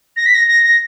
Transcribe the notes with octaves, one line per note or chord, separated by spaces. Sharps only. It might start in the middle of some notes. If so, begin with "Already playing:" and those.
A#6
B6
A#6
A#6
A#6